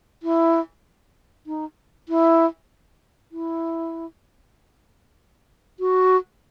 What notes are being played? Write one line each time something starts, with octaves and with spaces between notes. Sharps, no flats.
E4
D#4
E4
E4
F#4